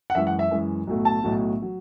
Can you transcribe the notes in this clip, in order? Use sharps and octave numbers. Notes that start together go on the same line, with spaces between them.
F#5
F#2 E3 G#3 E5
F#5
E5
F#2 E3 G#3
B1 A2 F#3 A3
A5
B1 A2 F#3 A3
F#3